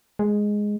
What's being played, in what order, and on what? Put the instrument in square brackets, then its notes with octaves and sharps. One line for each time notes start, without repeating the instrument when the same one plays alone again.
[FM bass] G#3